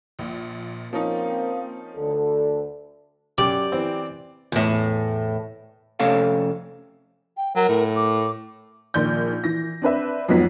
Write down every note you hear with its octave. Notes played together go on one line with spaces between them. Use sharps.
A#1 A#2
F3 A#3 C4 C#4 D#4
D2 D3 A4
F#2 G4 D5 D6
E3 C4
E2 A2
F2 C3 A3 C#4 A4 F5
G5
F#3 A#4
A2
D6
A#1 D#3 D5 G6
E3 A#6
C4 D4 B4 E5
F2 G#2 F#3 B3 B6